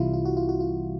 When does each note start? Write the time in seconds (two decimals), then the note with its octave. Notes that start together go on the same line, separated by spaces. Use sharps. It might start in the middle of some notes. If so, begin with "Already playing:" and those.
Already playing: C2 C3 E3 G3 E4 F4
0.13 F4
0.25 F#4
0.37 F4
0.49 F#4
0.60 F4